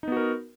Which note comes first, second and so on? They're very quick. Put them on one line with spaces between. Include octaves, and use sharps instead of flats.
D#4 B3 F#4 A#4